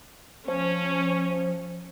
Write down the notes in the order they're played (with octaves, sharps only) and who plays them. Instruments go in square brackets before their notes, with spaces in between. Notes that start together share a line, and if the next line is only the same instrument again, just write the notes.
[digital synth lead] F3 [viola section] C#4